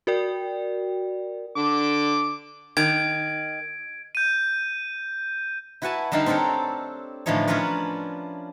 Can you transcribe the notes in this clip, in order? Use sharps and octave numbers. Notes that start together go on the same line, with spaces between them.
F#4 A#4 D5 G5
D3 D6
D#3 G#6 D7
G6 D#7
E4 F#4 B4 F#5 G#5 A5
D3 G3 D#4 F5 A5 B5
C4 D4 G4 A4 A#4 C#5
A2 D3 E3 F3 D#4 C#5
C#4 D4 F4 A#4 B4 C#5